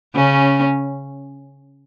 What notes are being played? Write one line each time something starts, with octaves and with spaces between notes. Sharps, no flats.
C#3 C#4